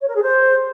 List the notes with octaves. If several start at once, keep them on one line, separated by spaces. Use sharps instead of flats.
C#5
A#4
G#4
C5